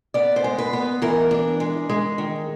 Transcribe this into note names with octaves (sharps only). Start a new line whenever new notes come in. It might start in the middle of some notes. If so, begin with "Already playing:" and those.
B3 D5
C5
G#3
B4
B3
E3 A#4
D4
G#3
G#3
D#3